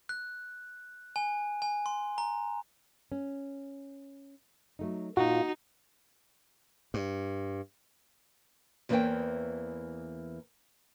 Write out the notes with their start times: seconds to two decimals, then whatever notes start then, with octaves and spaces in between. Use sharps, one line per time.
0.09 F#6
1.16 G#5
1.62 G#5
1.86 C6
2.18 A#5
3.12 C#4
4.79 F#3 A3 D#4
5.17 A#2 D#4 F4 F#4
6.94 G2
8.89 E2 E3 A#3 C#4 C5 G5